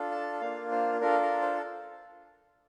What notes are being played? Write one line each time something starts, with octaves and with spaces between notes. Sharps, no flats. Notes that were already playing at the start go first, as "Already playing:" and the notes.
Already playing: D4 F4 A4
A5
A#3 D4 F4 F5
C5
D4 F4 A4 A#4
A#4
C5